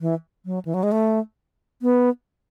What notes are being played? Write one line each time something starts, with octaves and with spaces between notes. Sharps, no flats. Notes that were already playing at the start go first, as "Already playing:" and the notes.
E3
F#3
E3
F#3
G#3
A3
B3